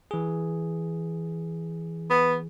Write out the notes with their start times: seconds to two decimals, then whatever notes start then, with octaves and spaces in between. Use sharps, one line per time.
0.11 E3 G#4
2.10 B3